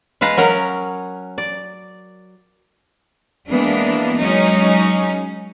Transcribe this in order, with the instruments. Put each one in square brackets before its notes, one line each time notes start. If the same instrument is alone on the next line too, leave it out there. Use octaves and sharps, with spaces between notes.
[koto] G#3 B4 F5 A#5
F#3 C#4 A#4
D5
[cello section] E3 G#3 A#3 B3 D4
F#3 G#3 C#4 D#4